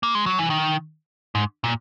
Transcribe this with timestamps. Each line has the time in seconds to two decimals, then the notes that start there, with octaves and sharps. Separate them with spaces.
0.03 A#3
0.15 G#3
0.26 F#3
0.38 E3
0.50 D#3
1.35 G#2
1.64 A#2